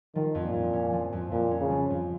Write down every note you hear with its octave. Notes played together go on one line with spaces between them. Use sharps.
D#3 F3
F2
A#2
F2
C#4
F3
F2
F2 A#2
C#4
C#3
F3
F2